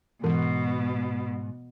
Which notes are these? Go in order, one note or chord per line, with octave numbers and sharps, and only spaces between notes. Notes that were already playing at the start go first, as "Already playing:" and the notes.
G#2 B2 E3